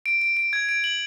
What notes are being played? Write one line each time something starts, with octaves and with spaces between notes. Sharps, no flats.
D7
D7
D7
G#6
D7
F#7